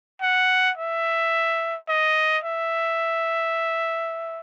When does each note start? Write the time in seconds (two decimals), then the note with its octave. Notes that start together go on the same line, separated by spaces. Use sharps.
0.22 F#5
0.77 E5
1.88 D#5
2.44 E5